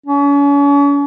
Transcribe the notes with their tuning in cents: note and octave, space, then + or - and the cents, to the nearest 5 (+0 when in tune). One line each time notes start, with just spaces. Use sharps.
C#4 +40